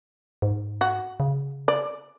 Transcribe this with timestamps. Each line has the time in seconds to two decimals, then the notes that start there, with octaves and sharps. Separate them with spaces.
0.42 G#2
0.81 F#4
1.20 C#3
1.68 D5